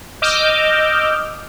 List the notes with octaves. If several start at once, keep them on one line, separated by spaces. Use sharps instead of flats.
D#5 D6 E6 F6 G6